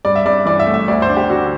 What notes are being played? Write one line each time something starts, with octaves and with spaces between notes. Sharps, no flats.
G2 D5
E5
G2 D5
E3 D5
E5
A3
E5
D2 D5
C5
D4
G4
D3 F#4